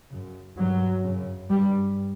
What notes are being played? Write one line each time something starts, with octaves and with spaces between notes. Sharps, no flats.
F#2 C#3
G2 F#3
F#2 C#3
G2 G3